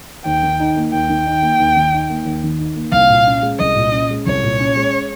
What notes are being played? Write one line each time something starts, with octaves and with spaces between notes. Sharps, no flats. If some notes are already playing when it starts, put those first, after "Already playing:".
D#2 G5
D#3
D#4
A#3
D#2 G5
D#3
D#4
A#3
D#2
D#3
D#4
A#3
D#2
D#3
D#4
A#3
C2 F5
A#2
C#4
G#3
C2 D#5
A#2
C#4
G#3
C2 C#5
A#2
C#4
G#3